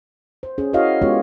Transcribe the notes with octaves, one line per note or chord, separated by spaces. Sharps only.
C5
C#4 G#4
E4 F#4 A#4 C#5 D#5 F5
G#3 B3 C#4 F4 G4 C#5